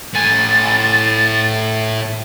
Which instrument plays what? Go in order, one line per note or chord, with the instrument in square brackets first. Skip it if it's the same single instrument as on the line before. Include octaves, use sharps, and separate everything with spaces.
[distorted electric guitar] A2 G#5 [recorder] A6